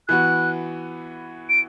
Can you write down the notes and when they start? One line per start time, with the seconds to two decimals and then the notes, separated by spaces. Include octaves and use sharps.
0.08 E3 B3 F#4 F#6
1.49 D7